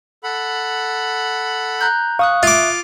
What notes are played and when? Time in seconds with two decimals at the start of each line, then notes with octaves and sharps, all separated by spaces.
0.24 A4 F#5 B5
1.81 A#5 F#6 G6
2.19 F5 C#6 D#6 F#6
2.43 F4 E5 D6